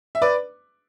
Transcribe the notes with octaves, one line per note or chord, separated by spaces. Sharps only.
E5
B4 D5